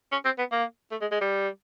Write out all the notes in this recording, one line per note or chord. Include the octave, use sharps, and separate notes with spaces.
C#4
C4
B3
A#3
A3
G#3
G#3
G3